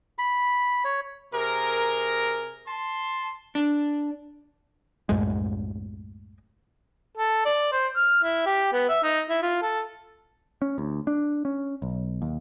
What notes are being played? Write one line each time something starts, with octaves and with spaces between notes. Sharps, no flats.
B5
C#5
C3 G#4 A#4
A5 C6
D4
C2 F#2 A2 G#3
A4
D5
C5
F6
E4
G4
B3
E5
D#4
E4
F4
A4
C#4
D2
D4
C#4
B1
D#2